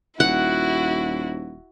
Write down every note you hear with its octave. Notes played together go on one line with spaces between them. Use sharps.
D#1 E4 F#4 F#5